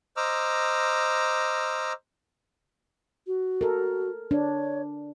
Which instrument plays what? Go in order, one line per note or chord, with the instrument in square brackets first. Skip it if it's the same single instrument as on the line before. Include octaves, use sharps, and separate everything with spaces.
[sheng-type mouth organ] C5 D#5 A#5 D6 E6 F6
[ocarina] F#4
[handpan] A4 A#4
[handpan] D4 [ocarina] C#5